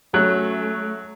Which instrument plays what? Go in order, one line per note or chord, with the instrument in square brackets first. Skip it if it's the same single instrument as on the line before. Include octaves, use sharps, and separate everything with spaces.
[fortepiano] F#3 [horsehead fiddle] A3 [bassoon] C#4 [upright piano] F#6